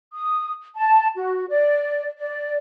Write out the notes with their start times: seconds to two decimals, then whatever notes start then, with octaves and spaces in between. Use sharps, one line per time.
0.13 D#6
0.75 A5
1.15 F#4
1.48 D5
2.19 D5